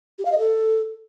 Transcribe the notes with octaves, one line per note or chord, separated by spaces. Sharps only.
G4
F5
D#5
A4